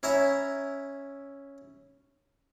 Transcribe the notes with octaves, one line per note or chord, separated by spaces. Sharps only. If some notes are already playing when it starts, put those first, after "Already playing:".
C#4 E4 E5 A#5